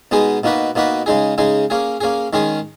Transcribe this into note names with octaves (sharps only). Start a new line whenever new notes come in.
B2 G#3 B3 D#4 G#4
B2 A#3 D#4 F#4 B4
B2 A#3 D#4 F#4 B4
C#3 G#3 D#4 G#4
C#3 G#3 D#4 G#4
A#3 C#4 G#4
A#3 C#4 G#4
D#3 G#3 C#4 G#4